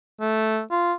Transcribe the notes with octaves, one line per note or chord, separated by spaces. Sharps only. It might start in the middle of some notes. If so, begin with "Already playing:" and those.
A3
F4